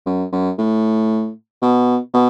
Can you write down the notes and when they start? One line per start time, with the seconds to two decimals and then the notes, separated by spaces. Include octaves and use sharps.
0.06 F#2
0.32 F#2
0.58 A2
1.62 B2
2.14 B2